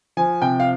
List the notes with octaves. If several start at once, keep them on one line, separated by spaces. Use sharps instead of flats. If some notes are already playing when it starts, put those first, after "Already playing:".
F3 G#5
C3 G5
F5